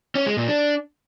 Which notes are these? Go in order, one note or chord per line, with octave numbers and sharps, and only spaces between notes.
C#4
G#3
A#2
D4